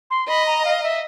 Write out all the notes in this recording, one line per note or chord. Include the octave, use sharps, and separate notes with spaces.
C6
D#5 B5
A#5
F5
E5